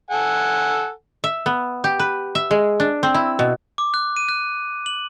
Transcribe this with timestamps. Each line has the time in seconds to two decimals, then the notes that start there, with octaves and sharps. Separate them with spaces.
0.11 A4 F#5 G#5
1.24 E5
1.46 B3
1.84 G4
1.99 B4
2.35 E5
2.51 G#3
2.80 D4
3.03 C4
3.14 E4
3.39 B2
3.78 D6
3.94 F#6
4.17 D#7
4.29 F#6
4.86 F#7